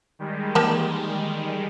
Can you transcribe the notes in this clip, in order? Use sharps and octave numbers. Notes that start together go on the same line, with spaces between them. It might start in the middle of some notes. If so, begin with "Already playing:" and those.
D#3 G3 G#3
E3 A#3 G4 A5